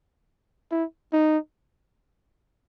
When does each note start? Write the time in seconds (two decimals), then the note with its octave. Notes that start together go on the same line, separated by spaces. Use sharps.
0.71 E4
1.13 D#4